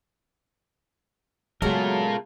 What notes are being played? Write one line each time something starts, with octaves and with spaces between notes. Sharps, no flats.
C#3 F#3 G#3 A3 B3 F4 A#4 G#5